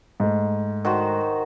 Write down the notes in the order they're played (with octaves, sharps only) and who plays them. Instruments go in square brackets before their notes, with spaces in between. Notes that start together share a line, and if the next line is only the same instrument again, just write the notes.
[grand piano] G#2 A3
[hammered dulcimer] D#3 F#4 C5